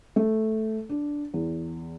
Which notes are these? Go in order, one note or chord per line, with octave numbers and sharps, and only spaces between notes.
A3
D4
E2